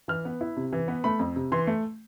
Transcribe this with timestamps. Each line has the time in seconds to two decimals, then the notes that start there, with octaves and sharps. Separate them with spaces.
0.08 E3 F6
0.25 B3
0.41 E4
0.57 C3
0.73 E3
0.88 B3
1.04 A3 B5
1.19 F2
1.36 C3
1.52 E3 C6
1.67 A3